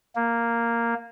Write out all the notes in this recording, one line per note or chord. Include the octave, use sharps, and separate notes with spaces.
A#3